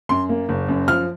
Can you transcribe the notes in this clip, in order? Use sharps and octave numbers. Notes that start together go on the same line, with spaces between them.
F#2 C6
A#3
F#1
F#2
F3 F6